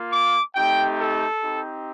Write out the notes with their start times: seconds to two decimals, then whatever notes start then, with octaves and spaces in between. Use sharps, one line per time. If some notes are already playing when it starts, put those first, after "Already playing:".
Already playing: A#3 F4
0.12 D6
0.55 A3 C4 D#4 G4 G5
1.00 A4
1.43 C4 D#4 G4